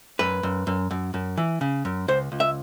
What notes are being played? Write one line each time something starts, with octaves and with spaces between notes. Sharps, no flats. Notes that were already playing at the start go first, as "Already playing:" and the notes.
F#2 B4
F#2
F#2
F#2
F#2
E3
C#3
F#2
C#2 C5
C#2
E5